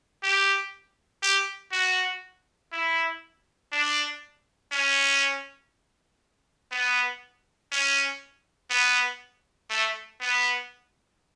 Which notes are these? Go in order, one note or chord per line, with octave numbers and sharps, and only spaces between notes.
G4
G4
F#4
E4
D4
C#4
B3
C#4
B3
A3
B3